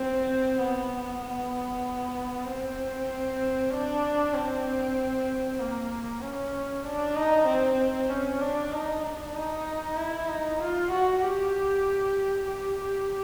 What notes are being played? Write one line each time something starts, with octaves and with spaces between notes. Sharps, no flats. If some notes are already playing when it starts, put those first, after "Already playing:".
Already playing: C4
B3
B3
C4
D4
C4
A#3
C#4
D4
D#4
C4
C#4
D4
D#4
D4
D#4
E4
D#4
F4
F#4
G4
G4